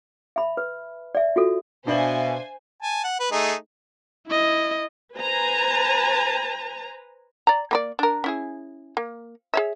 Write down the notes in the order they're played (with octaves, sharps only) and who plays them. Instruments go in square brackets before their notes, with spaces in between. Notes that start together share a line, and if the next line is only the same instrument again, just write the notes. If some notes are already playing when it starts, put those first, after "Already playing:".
[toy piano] E5 B5
B4
D5 E5
F4 F#4 A4
[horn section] B2 [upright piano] D4 D5 F#7 [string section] C5 G#5 [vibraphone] E5 F5
[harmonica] G#5 A5
F#5
B4
A3 D#4 G#4
[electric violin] E4 D#5
[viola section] B4 C5 G#5 A#5
[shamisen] D5 A#5
A#3 B4 D5
D4 A#4
C#4 E4 G#4
A#3
G#4 C#5 E5